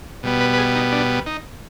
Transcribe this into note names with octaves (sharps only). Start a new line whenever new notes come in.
B2 G3 B3
B4
B4
G#4
D#4
D4
D#4